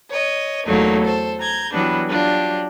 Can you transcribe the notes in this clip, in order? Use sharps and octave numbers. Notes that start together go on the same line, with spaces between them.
C#5 D#5
E2 F#3 A3 A#3 D#4
A4 C5
A#5 G6 G#6
E3 F#3 G3 B3 D4
F#3 D4 F4 G4